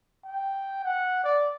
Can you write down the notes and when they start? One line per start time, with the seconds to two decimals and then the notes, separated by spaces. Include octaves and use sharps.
0.25 G5
0.84 F#5
1.24 D5